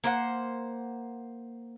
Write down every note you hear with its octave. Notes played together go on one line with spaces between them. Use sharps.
A#3 C5 F#5